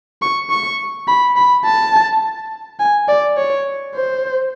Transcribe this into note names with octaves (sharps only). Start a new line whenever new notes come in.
C#6
C#6
B5
B5
A5
G#5
D5
C#5
C5